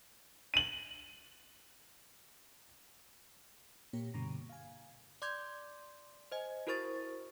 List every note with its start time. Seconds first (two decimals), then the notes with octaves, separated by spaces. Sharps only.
0.54 D#7 F#7
3.93 A#2 A#3 G4 C#5
4.14 G2 B2 D3 A#5 C#6 A#6
4.49 F5 G#5
5.22 D5 C6 D6 G6 G#6
6.32 C5 D#5 G#5
6.67 E4 F#4 A#4 C5 C#6 A6